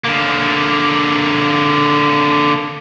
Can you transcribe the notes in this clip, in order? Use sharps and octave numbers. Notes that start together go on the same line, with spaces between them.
D3 A#3